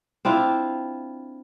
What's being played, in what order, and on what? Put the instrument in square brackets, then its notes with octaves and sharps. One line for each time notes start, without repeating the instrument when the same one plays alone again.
[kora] C4 D4 E4 F4